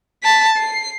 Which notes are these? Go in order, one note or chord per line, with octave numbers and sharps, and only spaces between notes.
A5 B6
C7